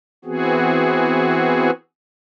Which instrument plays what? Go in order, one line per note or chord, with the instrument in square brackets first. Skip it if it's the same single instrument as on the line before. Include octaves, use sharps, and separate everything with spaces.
[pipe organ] E3 B3 C4 F#4 G#4